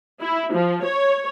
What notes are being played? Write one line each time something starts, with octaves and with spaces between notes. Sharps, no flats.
E4
F3
C#5